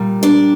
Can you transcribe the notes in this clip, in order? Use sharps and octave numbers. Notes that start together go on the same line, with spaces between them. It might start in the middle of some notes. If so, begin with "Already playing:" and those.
Already playing: A#2 G3
D4 D5